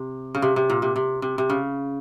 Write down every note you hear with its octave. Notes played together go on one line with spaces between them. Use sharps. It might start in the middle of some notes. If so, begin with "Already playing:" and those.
Already playing: C3
C#3
C3
C3
A#2
C3
C3
C3
C3
C#3